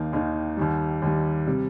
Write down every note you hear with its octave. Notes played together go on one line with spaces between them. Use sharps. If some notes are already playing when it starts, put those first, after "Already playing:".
Already playing: D#2 D#3 A#3 D#4
D#2 D#3 A#3 D#4
D#2 D#3 G3
D#2 D#3 G3
C3 G3